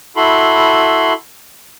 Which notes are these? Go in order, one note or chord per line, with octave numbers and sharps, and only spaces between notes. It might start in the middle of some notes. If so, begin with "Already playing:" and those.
E4 F#4 A4 B5 C6